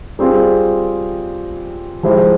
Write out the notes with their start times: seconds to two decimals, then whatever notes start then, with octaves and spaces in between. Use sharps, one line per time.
0.19 G3 C4 F4 G#4
2.03 F3 G#3 E4 G4 C5